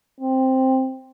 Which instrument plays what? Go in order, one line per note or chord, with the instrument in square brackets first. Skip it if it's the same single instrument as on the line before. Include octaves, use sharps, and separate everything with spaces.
[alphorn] C4